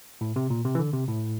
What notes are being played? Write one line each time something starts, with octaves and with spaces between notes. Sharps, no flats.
A2
C3
A#2
C3
E3
D3
C3
A2